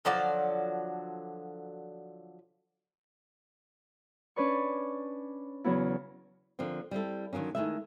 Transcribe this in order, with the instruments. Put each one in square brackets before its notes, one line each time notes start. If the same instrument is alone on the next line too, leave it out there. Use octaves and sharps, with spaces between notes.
[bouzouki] D3 F3 F#3 D5
[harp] C#4 D4 B4 D5 C#6
E2 C#3 F#3 B3 E4
[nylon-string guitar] D3 F3 A#3 C4
G3 C4 E4 A4
D3 D#3 F#3 A#3 C#4
D#3 F3 G#3 A3 E4 E5